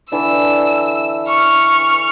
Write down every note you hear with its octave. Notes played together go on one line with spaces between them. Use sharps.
D3 E3 E6
C#6 F6